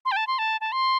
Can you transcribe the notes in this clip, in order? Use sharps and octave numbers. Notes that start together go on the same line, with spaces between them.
C6
G5
A5
C6
A5
A5
C6